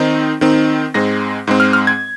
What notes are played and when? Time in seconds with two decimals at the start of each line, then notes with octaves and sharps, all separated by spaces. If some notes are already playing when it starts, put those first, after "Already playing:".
Already playing: D#3 C4 D#4
0.41 D#3 C4 D#4
0.94 G#2 G#3 C4 A#6
1.47 G#2 G#3 C4
1.60 F6
1.73 F6
1.87 G#6